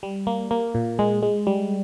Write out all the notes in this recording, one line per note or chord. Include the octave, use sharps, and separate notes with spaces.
G3
A#3
A#3
A#2
G#3
G#3
G3